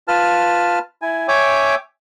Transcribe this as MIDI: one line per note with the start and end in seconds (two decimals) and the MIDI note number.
0.08 0.79 65
0.08 0.79 71
0.08 0.79 81
0.08 0.79 89
1.02 1.27 64
1.02 1.27 80
1.28 1.75 73
1.28 1.75 76
1.28 1.75 79
1.28 1.75 80
1.28 1.75 86